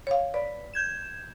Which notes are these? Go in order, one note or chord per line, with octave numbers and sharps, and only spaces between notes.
C#5 F5
B4 D5
G6 G#6 E7